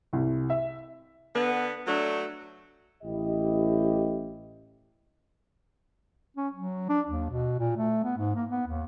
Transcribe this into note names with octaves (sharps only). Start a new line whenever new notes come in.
C2
E5
D3 B3
F#3 A3 D4
A1 E4 G4 D#5
C#4
F#3
D4
D#2
B2
A#2
A3
B3
G#2
A#3
B3
D#2